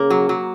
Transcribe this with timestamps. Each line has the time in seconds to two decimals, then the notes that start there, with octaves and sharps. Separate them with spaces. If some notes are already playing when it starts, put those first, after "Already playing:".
Already playing: C#3 A#3
0.10 F#3
0.29 F#3